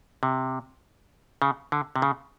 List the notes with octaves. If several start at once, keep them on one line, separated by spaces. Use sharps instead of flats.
C3
C#3
D3
C3
C#3